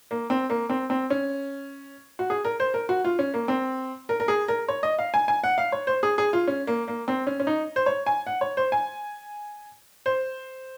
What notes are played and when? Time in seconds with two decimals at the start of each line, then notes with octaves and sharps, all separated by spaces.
0.11 A#3
0.30 C4
0.50 A#3
0.70 C4
0.90 C4
1.10 C#4
2.19 F#4
2.30 G#4
2.45 A#4
2.60 C5
2.74 A#4
2.89 F#4
3.04 F4
3.19 C#4
3.34 A#3
3.48 C4
4.09 A#4
4.20 A#4
4.28 G#4
4.48 A#4
4.68 C#5
4.83 D#5
4.99 F5
5.14 G#5
5.28 G#5
5.44 F#5
5.58 F5
5.72 C#5
5.87 C5
6.03 G#4
6.18 G#4
6.33 F4
6.47 C#4
6.67 A#3
6.88 A#3
7.08 C4
7.27 C#4
7.40 C#4
7.47 D#4
7.76 C5
7.86 C#5
8.06 G#5
8.27 F#5
8.41 C#5
8.57 C5
8.72 G#5
10.06 C5